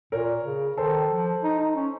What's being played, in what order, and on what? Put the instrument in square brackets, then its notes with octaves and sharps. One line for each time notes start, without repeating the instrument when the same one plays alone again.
[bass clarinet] A#2 [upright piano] A#4 C#5
[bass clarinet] C#3
[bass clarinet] D#3 [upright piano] A4 C5
[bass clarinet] F3
D#4
D#4
C#4